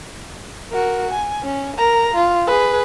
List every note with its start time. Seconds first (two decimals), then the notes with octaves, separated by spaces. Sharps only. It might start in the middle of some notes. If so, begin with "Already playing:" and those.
0.71 F#4 A#4
1.11 G#5
1.43 C#4
1.76 A#4 A#5
2.14 F4
2.47 G#4 B4